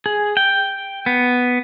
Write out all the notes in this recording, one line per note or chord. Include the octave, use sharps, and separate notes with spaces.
G#4
G5
B3